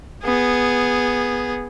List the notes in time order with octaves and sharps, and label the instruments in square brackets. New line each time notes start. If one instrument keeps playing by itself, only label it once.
[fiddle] B3 G#4